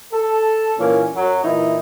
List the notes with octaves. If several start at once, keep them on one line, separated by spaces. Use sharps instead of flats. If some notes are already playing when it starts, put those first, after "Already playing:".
A4
A#2 E3 A#3 C#4
F#2 F#3
A#2 E3 D#4 E4